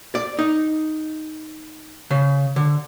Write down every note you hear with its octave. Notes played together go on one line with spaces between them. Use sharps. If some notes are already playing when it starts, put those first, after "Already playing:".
D5
D#4
C#3
D3